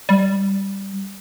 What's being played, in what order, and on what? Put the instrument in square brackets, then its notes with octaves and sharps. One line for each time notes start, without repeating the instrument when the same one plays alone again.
[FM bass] G3